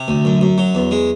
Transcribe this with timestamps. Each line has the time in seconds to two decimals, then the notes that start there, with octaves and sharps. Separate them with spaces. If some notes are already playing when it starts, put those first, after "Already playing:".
Already playing: C3
0.08 D2
0.25 F#2
0.41 F#2
0.58 F#3
0.75 E2
0.91 G#3